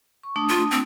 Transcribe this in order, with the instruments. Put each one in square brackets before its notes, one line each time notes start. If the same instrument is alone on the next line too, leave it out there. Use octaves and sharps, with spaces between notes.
[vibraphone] C#6
A3 D4 D#6
[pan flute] F4
C4